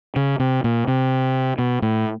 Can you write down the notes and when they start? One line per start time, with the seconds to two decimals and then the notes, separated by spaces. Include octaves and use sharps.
0.16 C#3
0.40 C3
0.64 A#2
0.88 C3
1.58 B2
1.82 A2